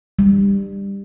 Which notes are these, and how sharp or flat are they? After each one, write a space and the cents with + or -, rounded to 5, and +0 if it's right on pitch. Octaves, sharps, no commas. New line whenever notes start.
G3 +20